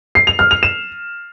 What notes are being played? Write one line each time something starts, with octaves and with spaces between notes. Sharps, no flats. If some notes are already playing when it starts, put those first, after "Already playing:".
C7
F7
F6
F7
E7